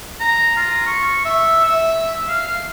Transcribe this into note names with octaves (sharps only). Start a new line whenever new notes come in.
A#5
F4
C#6
E5
E5
F5